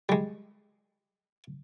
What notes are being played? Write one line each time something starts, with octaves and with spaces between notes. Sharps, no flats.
G3 G#3